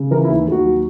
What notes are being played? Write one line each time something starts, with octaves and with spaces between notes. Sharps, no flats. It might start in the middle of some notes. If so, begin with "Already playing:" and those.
Already playing: C#3
E3 A#4
E4
D#2
D#2 F#4
F#3